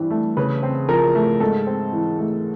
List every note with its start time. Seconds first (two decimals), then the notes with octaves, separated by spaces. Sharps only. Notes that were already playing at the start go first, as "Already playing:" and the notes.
Already playing: G2 E3 C4
0.11 A3
0.37 C#3 B4
0.63 C4
0.89 F3 A#4
1.15 A3
1.40 G#2 A4
1.67 C4
1.93 E3
2.19 A3